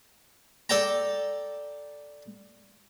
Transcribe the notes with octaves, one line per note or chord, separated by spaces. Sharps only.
A4 D5 G5 A5 A#5